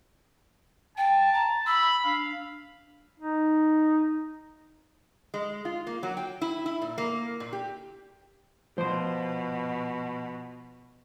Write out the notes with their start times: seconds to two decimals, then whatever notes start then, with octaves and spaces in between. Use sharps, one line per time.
0.98 G5 A5
1.34 A#5
1.67 B5 E6
2.04 D4 F5
3.20 D#4
5.34 G#3
5.65 F4
5.87 A#3
6.03 F#3
6.17 G5
6.41 E4
6.66 E4
6.82 A#2
6.98 A#3
7.40 A#2
7.53 G4
8.78 B2 F3 C5 C6